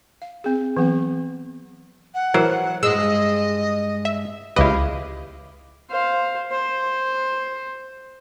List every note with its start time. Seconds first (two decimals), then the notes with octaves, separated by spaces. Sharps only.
0.22 F5
0.44 C4 G#4
0.77 E3 F#3 B3 C4
2.14 F#5
2.34 E3 F#3 A#4 C5
2.83 G2 G#3 D#5 E6
4.05 E5
4.56 C#2 E4 G4 B4 D#5 F5
5.90 C5 F5
6.52 C5